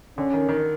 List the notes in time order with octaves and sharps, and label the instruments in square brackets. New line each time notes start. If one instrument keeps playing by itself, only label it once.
[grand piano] D3 [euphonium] C#4
[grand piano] D#3
D#3